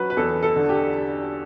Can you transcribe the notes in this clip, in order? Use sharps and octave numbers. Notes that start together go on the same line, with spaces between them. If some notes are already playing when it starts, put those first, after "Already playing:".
Already playing: F#3 C#4 B4
B4
E2 A4
A4
D3
G4